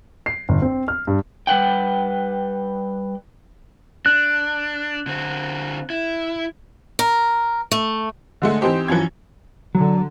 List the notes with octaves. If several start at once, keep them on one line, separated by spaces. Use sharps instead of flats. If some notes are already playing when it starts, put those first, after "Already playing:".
C7
G1
C4
F6
G2
G3 B4 F#5 G5
D4 F#6
D3 C4
E4
A#4
A3
D3 G#3 A3
E3 C4 D#4 G4 C5
F#2 E3 F3 C#4 G#6
D3 F#3